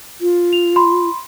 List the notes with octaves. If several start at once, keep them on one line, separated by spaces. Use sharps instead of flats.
F4
F7
B5 C6